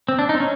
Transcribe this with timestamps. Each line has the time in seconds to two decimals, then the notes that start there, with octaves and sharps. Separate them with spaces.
0.09 C4
0.19 D4
0.29 D#4
0.35 C4
0.40 C#4